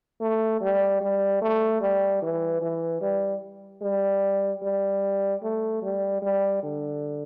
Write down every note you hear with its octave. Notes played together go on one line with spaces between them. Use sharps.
A3
G3
G3
A3
G3
E3
E3
G3
G3
G3
A3
G3
G3
D3